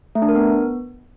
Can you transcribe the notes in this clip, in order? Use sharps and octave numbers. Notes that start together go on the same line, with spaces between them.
A3
D4
A#4
B3